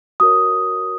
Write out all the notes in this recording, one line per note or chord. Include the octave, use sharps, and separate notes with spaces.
F#4 A#4 C#5 D#6